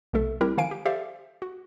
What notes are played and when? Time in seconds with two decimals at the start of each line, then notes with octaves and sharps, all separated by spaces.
0.13 B1 C3 A3 A4 E5
0.41 G3 C4 E4 G4 A#4
0.58 D#3 F3 F5 G#5 D7
0.71 G4
0.86 G4 A4 C5 D5 E5 F5
1.42 F#4